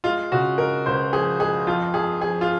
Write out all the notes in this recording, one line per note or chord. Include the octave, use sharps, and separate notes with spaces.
G#3 F4
C#3 F#4
G#3 A#4
C#2 C5
F3 G#4
G#3 G#4
F2 F4
F2 G#4
F3 G#4
F4